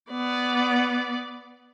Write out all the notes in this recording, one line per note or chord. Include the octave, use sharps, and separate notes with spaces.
B3 D5